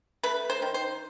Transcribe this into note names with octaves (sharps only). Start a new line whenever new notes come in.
A3 B4
C5
D#3
C5